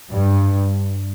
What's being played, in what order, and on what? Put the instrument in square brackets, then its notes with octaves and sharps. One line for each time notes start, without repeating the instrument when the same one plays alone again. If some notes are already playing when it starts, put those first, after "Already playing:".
[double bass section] G2